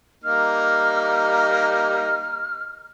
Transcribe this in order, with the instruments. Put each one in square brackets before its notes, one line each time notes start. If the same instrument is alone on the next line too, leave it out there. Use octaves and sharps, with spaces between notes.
[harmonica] G3 A#3 D#4 [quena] F6